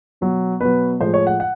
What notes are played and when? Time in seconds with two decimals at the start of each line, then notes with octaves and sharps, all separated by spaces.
0.21 B2 F#3
0.60 B2 F#3 B4
0.99 A2 F3 G#3 C5
1.14 C#5
1.27 F#5
1.40 F#5